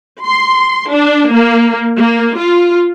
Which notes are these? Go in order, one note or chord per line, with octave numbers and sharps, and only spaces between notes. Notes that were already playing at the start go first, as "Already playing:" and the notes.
C6
D4
A#3
A#3
F4